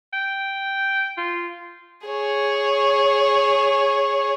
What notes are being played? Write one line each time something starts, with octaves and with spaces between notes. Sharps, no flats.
G5
F4
G#4 C#5